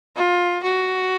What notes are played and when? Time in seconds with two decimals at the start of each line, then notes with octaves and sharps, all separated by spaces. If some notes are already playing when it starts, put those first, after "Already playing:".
0.16 F4
0.63 F#4